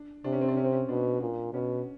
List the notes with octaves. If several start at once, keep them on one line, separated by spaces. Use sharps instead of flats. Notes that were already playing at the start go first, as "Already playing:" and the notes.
Already playing: D4
C3 D4
C#4
C4
D4
C#4
C4
C#4
B2 D4
A#2
B2 C#4